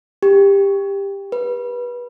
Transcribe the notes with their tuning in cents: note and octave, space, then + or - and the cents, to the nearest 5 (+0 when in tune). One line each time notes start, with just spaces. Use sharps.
G4 +15
B4 -25